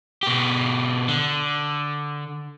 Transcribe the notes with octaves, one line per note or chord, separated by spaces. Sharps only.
B2 G4
D3